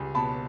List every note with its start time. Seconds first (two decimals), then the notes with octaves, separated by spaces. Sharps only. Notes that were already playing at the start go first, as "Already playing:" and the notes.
Already playing: C#2 G3 G#5
0.15 B2 A5 B5